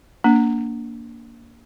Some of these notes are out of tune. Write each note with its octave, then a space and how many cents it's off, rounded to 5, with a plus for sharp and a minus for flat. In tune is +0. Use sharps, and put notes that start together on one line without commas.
A#3 +0 D4 -25